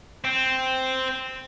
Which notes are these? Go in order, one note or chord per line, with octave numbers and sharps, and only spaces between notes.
C4